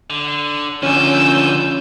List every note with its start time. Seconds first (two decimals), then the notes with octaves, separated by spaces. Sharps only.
0.10 D3
0.83 D3 F3 C#4 F4 G#5 E6 G6